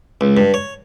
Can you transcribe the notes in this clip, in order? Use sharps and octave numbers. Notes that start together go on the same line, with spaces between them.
C#2
G2
C#5